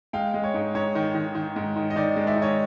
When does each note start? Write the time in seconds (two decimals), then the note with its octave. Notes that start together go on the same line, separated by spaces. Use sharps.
0.13 G#3 F5 G5
0.34 G#3
0.44 C#5
0.54 G#2
0.75 G#2 C#5
0.95 D#3
1.14 D#3
1.35 D#3
1.56 G#2
1.76 D#3
1.90 D#5
1.96 D#3 D5
2.16 G#3
2.27 D5 E5
2.36 D#3
2.42 C#5 D#5